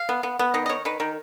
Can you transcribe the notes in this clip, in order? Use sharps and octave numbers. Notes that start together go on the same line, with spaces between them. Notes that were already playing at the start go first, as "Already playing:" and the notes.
Already playing: F5
B3
B3
B3
D#3 D#5
D#5
D#3 C#5
D#3 B4
D#3 A#4